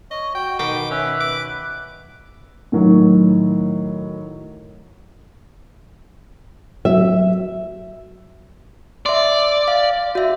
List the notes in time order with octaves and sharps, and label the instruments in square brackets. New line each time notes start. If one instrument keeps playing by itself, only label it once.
[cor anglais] C#5 [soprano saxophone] D#5
[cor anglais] F#4 [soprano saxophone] G5
[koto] B2 D#3 G5 [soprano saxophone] D6
[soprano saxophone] C#4 [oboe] B4 [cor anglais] E5
[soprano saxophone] D6
[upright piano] A2 D#3 F#3
[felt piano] F#3 [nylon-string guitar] E5
[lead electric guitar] D5 [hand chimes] E5 C6
[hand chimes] F5
F#4 E5